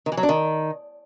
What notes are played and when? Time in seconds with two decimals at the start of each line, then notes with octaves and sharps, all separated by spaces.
0.06 D#3
0.12 E3
0.17 F#3
0.23 D4
0.29 D#3